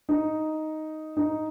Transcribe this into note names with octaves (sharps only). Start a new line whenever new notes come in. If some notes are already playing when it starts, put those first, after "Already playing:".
D#4
D#4